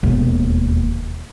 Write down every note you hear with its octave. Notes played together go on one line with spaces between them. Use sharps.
E1 D#2